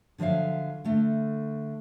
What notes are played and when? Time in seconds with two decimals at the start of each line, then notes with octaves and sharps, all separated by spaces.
0.18 D3 F3 F#3 E5 F5
0.84 D3 A3